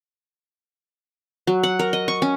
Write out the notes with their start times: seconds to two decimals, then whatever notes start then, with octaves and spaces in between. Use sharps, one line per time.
1.47 F#3
1.63 F#5
1.79 A#4
1.93 D#5
2.08 C#6
2.22 C#4